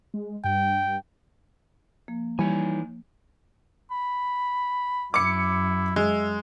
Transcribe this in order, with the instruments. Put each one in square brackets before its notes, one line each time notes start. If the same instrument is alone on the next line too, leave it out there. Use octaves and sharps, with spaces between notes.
[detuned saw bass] G#3
[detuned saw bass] G2 [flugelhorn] G5
[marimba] F3 A#3
[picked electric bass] E3 [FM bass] G3 [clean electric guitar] D#4 C#5 G#5
[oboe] B5
[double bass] F#2 [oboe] E4 [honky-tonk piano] D6 C#7
[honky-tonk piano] G#3 [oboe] E5